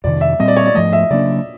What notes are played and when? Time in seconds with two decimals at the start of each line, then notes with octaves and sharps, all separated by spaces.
0.04 F2 C3 D#3 D5
0.21 E5
0.39 A#2 G3 C4 D#5
0.48 D5
0.56 C#5
0.66 D5
0.74 G#2 F3 A3 D#5
0.93 E5
1.10 C#3 F#3 A#3 D4 D5